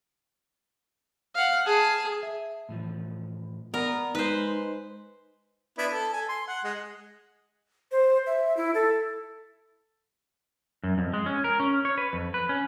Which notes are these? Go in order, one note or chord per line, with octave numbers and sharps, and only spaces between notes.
F5 F#5
G#4 A5
E5
A2 E3 F3
B3 A#4 D5 A#5
G#3 D#4 B4 C5
B3 D4 E4
A4
A4 G#5
C6
F#5
G#3
C5
E5
E4
A4
F#2
F2
G#3
C#4
A#4
C#4
C#5
B4
F2
B4
C#4